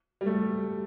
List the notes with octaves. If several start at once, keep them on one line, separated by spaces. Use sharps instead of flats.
G3
A3